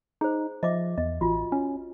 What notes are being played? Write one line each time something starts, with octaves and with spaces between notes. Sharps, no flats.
D#4 G#4 C5
F3 D#5 E5 D6
E2 D#5
A1 F4 F#4
C#4